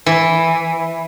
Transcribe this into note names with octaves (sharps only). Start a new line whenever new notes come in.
E3